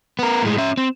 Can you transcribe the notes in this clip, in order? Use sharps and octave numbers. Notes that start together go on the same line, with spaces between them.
B3 A#4
A2 G#3
C#4 E5
C4